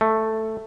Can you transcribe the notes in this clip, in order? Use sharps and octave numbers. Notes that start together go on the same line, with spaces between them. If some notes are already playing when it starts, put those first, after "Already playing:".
A3